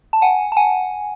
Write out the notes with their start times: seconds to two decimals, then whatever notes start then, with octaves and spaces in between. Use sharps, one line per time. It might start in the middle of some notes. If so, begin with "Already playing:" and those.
0.13 A5
0.22 F#5 G#5
0.52 A5
0.57 F#5 G#5